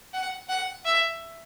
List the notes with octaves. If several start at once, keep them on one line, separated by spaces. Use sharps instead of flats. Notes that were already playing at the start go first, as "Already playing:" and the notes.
F#5
F#5
E5